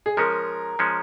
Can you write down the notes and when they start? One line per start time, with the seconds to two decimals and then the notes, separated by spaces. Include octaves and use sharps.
0.06 G#4
0.17 F3 G#3 C#4 A#4
0.79 F3 G#3 C#4